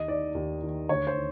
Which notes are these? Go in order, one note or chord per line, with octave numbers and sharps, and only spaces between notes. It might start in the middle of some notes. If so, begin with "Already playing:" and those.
Already playing: D#2 D#5
D#3 D5
D#2
D#3
D2 C#5
C5
D#3